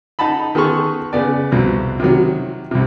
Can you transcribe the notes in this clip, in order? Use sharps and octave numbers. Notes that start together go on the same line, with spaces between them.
D#4 F#5 A5 B5
D#3 B3 G#4 A4 C6 C#6
C#3 B3 D5
C2 F2 B2
C3 D#3 F#3
C2 C3